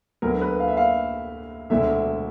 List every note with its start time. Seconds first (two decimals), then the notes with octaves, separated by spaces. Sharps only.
0.22 D2 D3 F#3 B3 A#4
0.41 B4
0.60 F5
0.68 E5
0.77 F5
1.70 E1 D2 D3 E5